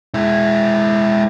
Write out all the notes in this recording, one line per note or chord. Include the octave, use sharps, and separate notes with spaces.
G#3 E4